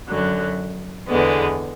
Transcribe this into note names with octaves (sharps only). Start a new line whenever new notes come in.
F#2 D3 F#3
E2 D3 G#3 B3